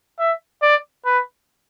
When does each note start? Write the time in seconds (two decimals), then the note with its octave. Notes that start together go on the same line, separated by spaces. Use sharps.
0.19 E5
0.62 D5
1.05 B4